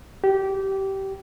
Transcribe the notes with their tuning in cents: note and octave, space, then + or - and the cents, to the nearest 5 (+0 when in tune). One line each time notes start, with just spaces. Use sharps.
G4 -20